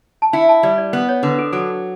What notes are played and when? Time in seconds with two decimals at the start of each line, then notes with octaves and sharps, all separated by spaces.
0.22 A5
0.33 E4 G5
0.49 A5
0.63 G3 D5
0.78 D5
0.93 B3
1.09 C#5
1.23 D3 B4
1.39 A4
1.52 F#3 A4